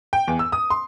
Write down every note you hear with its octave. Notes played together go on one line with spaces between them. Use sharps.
G5
E2
E6
D#6
C6